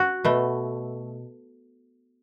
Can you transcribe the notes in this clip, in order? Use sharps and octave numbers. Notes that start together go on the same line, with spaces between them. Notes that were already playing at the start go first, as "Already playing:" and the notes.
Already playing: F#4
B2 A3